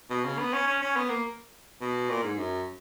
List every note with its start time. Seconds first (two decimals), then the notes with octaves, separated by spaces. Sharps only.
0.11 B2
0.25 C#3
0.39 B3
0.54 C#4
0.68 C#4
0.82 C#4
0.96 B3
1.10 A#3
1.81 B2
2.10 A#2
2.24 G#2
2.38 F#2